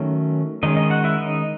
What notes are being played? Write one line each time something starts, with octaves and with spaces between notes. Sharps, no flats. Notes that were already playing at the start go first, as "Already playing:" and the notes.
Already playing: D#3 F#3 A3 C#4
D#3 G#3 C#4 D#4 D#5
D#4 D#5
F#4 F#5
E4 E5
D#4 D#5